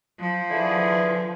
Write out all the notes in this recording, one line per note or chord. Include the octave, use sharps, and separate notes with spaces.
F3
D3 E3 G#4